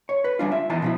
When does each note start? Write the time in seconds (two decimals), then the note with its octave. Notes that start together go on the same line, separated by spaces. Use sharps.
0.09 C#5
0.24 B4
0.39 G3 D4 F4
0.52 E5
0.69 E2 E3 D#4 A5
0.82 B2 F3 E4